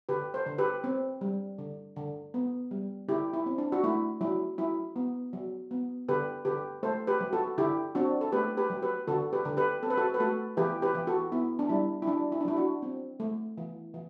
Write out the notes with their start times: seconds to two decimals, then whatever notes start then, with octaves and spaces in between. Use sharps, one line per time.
0.09 D3 G4 B4
0.34 A4 C5
0.46 D3
0.58 G4 B4
0.84 C4
1.21 G3
1.58 D3
1.96 D3
2.34 B3
2.71 G3
3.09 D3 E4 G4
3.33 E4
3.46 C4
3.58 D4
3.72 F#4
3.83 A3 E4
4.21 F#3 E4
4.58 F#3 E4
4.96 B3
5.33 F#3
5.71 B3
6.09 D3 G4 B4
6.45 D3 G4 B4
6.83 A3 A4 C5
7.07 G4 B4
7.21 F#3
7.33 F#4 A4
7.58 D3 E4 G4
7.95 C4 D4 F#4
8.21 A4
8.32 A3 G4 B4
8.57 G4 B4
8.70 F#3
8.82 G4 B4
9.08 D3 F#4 A4
9.33 G4 B4
9.45 D3
9.57 G4 B4
9.83 C4 A4
9.90 B4
9.97 F#4 A4
10.14 B4
10.20 A3 F#4 A4
10.57 E3 G4 B4
10.82 G4 B4
10.95 E3
11.07 F#4 A4
11.32 B3 E4
11.59 D4
11.69 G3 E4
12.02 E4
12.07 F#3 D4
12.32 E4
12.41 D4
12.45 F#3 E4
12.57 D4 F#4
12.82 C4
13.20 A3
13.58 E3
13.94 E3